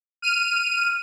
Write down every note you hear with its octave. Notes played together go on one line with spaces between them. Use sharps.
F6 D#7